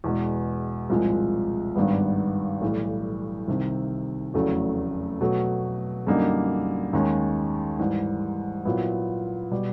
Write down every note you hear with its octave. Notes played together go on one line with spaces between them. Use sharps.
E2 B2 G#3
C2 A#2 F3 G#3
G#1 G2 D#3 G3 B3
B1 A2 E3 G3
C2 C3 D#3
F1 E2 C#3 F#3 A3
B2 F#3 A3
F#2 D3 G3 A#3 D#4
D#2 D#3 G#3 C#4
G#2 E3 G3
A#2 F#3 B3 E4
B2 G3